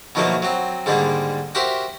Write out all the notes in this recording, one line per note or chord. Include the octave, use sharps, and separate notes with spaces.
B2 D#3 F3 F#3 A3 A#3
F#3 C4
G#2 D3 D#3 G3 A#3
F#4 G4 A#4 C5 E5